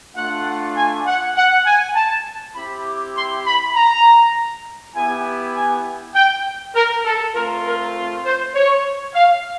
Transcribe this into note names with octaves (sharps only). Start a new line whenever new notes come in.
A3 D4 F4 F#5
F#5
G#5
F#5
F#5
G#5
A5
C4 E4 G4 B5
D6
C6
B5
A#5
B3 E4 G4 G#5
G#5
G5
A#4
A4
A3 C4 F4 A#4
A#4
C5
C#5
F5